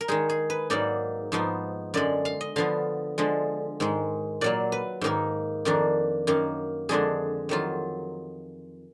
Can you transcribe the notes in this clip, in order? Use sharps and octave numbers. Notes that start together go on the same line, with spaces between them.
A#4
D#3 G#3 D#4 G#4
G#4
B4
G#2 F#3 A#3 D#4 D5
G#2 F3 B3 D#4
F#2 D3 G#3 D5
F5
D#5
D3 F3 B3 F5
D3 F3 G#3
G#2 D#3 G#3
A#2 F#3 A#3 D5
B4
G#2 D#3 A#3 D#4 A#4
F2 D#3 A#3 D4
F#2 D#3 A#3
F2 D3 G#3 D4 G#4
F2 D#3 F#3 F4